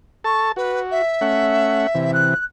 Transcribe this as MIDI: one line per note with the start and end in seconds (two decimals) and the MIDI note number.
0.24 0.52 69
0.24 0.52 81
0.24 0.49 85
0.56 1.02 66
0.56 0.80 71
0.91 2.11 76
1.21 1.87 57
1.21 1.87 61
1.21 1.87 78
1.95 2.34 48
1.95 2.34 52
2.13 2.44 90